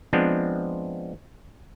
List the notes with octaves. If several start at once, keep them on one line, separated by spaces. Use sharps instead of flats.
F3 G#3 B3 C4 D4